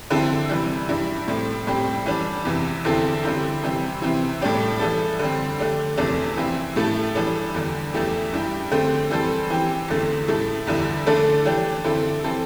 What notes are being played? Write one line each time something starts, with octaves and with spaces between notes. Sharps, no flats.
D3 C4 E4 A4
C3 E3 G3
G2 G3 E4
A2 G3 C4
A2 G3 C4 G4
E3 G3 D4
E2 C3 E3
E2 D3 C4 E4 A4
D3 G3 C4 E4 G4
C3 E3 G3 C4 G4
C3 E3 C4 E4
A2 G3 D4 G4
E3 G3 E4 A4
D3 G3 C4
D3 A3 D4 G4
E2 C3 E3 A3 D4
E3 C4 E4
A2 A3 E4 A4
E3 G3 D4 A4
E2 D3 G3
E2 E3 A3 E4 G4
G2 G3 E4 G4
D3 A3 C4 G4
E3 G3 C4 A4
E3 C4 G4
E2 D3 A3 C4
A2 A3 E4 A4
E2 D3 G3 E4
D3 A3 D4 A4
E3 A3 D4 G4
D3 C4 E4 A4
E3 C4 A4